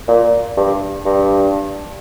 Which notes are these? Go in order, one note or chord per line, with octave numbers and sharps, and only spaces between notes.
A#2
G2
G2